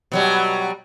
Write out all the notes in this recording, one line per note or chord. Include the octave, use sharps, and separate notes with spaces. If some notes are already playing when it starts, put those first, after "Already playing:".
B2 F#3 G3